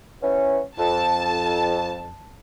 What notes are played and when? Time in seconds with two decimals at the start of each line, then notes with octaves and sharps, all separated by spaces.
0.22 E3 B3 C#4
0.78 F2 A5